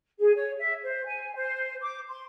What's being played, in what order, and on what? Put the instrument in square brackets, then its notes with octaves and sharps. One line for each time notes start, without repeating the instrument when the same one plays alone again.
[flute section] G#4
C#5
E5
C5
G#5
C5
D6
C6